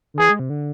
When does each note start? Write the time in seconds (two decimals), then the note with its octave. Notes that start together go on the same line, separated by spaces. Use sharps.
0.14 D3
0.19 E3 G#4
0.30 G#3
0.39 C3
0.50 D3